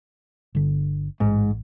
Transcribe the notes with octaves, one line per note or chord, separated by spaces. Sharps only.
G1 D3
A1 G#2